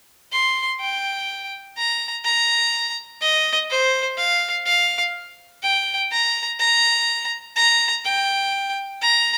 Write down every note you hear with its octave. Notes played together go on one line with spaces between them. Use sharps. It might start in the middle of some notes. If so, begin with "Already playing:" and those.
C6
G5
A#5
A#5
D#5
C5
F5
F5
G5
A#5
A#5
A#5
G5
A#5